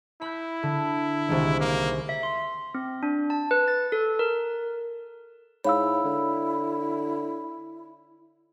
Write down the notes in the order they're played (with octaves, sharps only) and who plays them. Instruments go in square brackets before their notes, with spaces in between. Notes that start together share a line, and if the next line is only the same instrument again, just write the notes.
[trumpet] E4 [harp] B5 G6
[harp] D3
C2 D#3 G#3
[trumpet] A#3
[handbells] E5
C6
C4
D4
A5
B4
A6
A4
A#4
[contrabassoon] G#2 [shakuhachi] E4 [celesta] C#5 F5 E6 [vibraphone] B5
[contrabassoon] D3